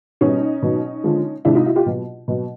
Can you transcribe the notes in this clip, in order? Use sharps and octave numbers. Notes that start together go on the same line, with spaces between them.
B2 G3 C#4 D#4
B2 F#3
D3 F3 G#3
C3 F3 G#3 D4 E4
D#4 F4
E4 F#4
F4 G4
B2 F#3
B2 F#3